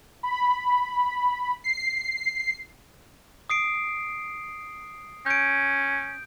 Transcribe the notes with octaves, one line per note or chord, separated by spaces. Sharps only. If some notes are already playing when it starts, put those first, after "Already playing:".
B5
C7
D#6 C7 D7
C#4 G6 D7